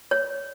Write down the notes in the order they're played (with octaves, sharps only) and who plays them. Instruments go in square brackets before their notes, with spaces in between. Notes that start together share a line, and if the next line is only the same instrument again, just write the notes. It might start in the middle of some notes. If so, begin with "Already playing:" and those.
[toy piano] C#5